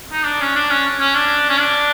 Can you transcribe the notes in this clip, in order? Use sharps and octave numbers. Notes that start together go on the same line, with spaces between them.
D#4
D4
C#4
D4
C#4
C#4
D4
C#4
D4